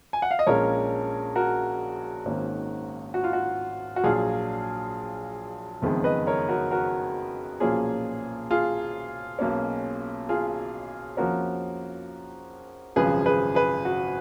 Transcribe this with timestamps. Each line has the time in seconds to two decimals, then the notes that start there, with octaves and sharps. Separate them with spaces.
0.13 G#5
0.22 F#5
0.31 F5
0.39 D#5
0.47 A#1 A#2 G#3 C#4 A#4 C#5
1.36 F#4 A#4
2.26 G#1 G#2 D#3 A#3 C#4
3.14 F#4
3.24 F4
3.33 F#4
3.96 F#4
4.04 A#1 A#2 F#3 F4 G#4
5.82 F#1 F2 D#3 G#3 B3
6.04 B4 D#5
6.27 A#4 C#5
6.49 F#4 A#4
6.71 F#4 A#4
7.60 B1 A#2 F3 A#3 C#4 F4 G#4
8.50 F4 G#4
9.39 B1 B2 A#3 C#4
10.29 F4 G#4
11.17 F2 F3 A#3 C#4 F#4 A#4
12.96 G#1 F#2 C#3 F3 G#3 G#4 B4
13.26 G#4 B4
13.55 G#4 B4
13.85 F#4